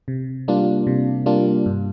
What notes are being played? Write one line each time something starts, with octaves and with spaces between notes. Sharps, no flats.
C3
G3 A#3 D4 F4
C3
G3 A#3 D4 F4
G2